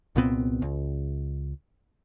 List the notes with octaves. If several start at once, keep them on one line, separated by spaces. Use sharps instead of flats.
C2 A#2 B3 C4
C#2